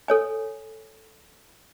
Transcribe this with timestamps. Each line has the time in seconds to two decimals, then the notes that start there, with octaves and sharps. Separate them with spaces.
0.08 A4 C#5 G#5